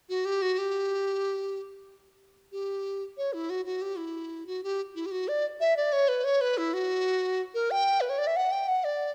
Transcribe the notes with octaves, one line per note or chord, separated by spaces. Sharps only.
F#4
G4
F#4
G4
G4
C#5
E4
F#4
F#4
G4
E4
F#4
G4
E4
G4
F#4
D5
E5
D5
C#5
B4
C#5
B4
E4
F#4
A#4
G5
B4
C#5
D5
E5
F#5
G5
F#5
D5